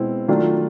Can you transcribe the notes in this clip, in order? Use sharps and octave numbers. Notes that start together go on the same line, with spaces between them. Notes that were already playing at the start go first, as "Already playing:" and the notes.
Already playing: B2 G#3 C4 E4
D#3 F#3 A3 D4 F4